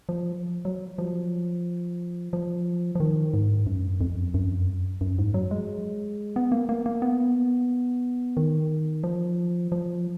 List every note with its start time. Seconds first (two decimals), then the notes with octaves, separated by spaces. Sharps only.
0.09 F3
0.65 F#3
0.98 F3
2.33 F3
2.95 F3
3.00 D#3
3.34 G#2
3.67 F#2
4.01 F2
4.34 F#2
5.01 F#2
5.18 G#2
5.34 F#3
5.51 G#3
6.36 B3
6.52 A#3
6.69 A#3
6.86 A#3
7.02 B3
8.37 D#3
9.04 F3
9.72 F3